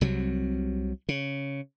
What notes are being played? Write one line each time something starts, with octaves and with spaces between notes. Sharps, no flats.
C2 C3 F#3
C#3